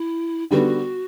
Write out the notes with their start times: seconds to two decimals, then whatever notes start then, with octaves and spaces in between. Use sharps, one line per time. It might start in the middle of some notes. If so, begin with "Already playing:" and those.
Already playing: E4
0.51 D3 G3 B3 F#4